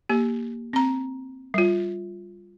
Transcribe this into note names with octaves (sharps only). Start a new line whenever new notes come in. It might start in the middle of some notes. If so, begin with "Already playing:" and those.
A#3 G4
C4 A#5
G3 F4